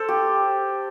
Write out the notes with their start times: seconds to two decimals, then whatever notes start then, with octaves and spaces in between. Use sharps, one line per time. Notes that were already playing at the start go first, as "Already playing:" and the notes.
Already playing: A4 C5
0.08 G4